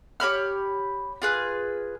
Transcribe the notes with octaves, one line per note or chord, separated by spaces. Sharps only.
G4 C#5 B5 F6
F4 G#4 B4